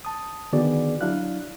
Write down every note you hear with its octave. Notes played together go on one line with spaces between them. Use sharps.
A5 D#6
D3 D#3 B3 F#4 G#4 D5
F#3 D4 E4 F5 F#6